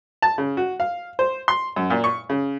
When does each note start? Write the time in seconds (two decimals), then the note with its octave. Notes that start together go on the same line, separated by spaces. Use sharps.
0.22 A5
0.38 C#3
0.57 F#4
0.80 F5
1.19 C5
1.48 C6
1.76 F#2
1.90 A#2
2.04 C#6
2.30 C#3